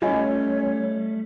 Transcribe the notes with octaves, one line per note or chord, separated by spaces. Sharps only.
G3 A3 C#4 F4 C#5 D#5 G#5